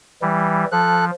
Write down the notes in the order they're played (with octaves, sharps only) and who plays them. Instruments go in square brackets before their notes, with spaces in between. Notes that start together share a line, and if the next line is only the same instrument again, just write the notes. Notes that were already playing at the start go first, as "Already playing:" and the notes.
[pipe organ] E3 G3
[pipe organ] F3 [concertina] A4 F#6